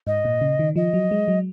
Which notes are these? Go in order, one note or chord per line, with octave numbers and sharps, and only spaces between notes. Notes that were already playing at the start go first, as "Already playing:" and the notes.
G#2 D#5
A#2
C#3
D#3
F3 D#5
F#3
G#3
F#3